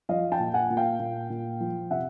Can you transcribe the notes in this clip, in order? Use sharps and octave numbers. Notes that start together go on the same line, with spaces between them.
F3 D#5 F5
G5 A5
A#2
F#5 G#5
A#2
F5 G5
A#2
A#2
F3
C3 E5 F#5